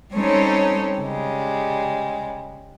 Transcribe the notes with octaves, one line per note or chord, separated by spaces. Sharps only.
G3 C4 C#4 D#4 A4 C#5
C#3 G3 G#3